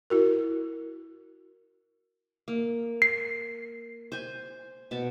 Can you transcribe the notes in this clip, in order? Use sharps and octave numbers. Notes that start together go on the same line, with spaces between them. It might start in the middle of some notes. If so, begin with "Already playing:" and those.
E4 F#4 A#4
A#3
C7
C5 G#5
B2 A5